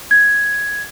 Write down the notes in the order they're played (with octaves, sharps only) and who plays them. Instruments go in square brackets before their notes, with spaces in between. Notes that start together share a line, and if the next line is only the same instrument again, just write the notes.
[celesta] G#6